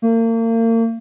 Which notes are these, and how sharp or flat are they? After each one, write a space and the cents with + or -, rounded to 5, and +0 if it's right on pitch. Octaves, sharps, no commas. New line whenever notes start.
A#3 -40